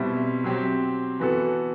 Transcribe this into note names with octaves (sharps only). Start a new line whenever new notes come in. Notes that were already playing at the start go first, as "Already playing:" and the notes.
Already playing: B2 G3 C4 E4
F#3 C4 G4
E3 B3 F#4 A4